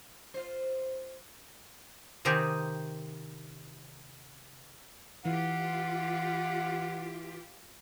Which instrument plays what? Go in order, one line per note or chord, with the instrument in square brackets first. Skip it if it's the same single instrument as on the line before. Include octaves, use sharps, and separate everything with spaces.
[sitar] F4 C5
[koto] C3 D#3 C4 D#4 G4 G#4
[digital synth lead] E3 [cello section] F4 G4 [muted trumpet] F#5